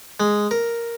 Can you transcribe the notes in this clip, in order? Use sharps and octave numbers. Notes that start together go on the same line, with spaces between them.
G#3
A#4